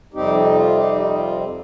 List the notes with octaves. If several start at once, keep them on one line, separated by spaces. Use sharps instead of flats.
F2 C3 G3 C4 D#4 G4
D#4
F4
D#4 G4
D#4
F4